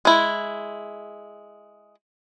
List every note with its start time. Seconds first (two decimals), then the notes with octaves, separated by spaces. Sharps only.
0.05 G#3 E4